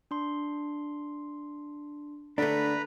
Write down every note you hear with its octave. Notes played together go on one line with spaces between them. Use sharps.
D4 C6
D3 A3 D4 B4 A#5 B5